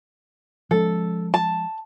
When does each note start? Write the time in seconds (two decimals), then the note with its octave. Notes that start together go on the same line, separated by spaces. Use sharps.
0.71 F3 G#3 C#4 A4
1.34 A5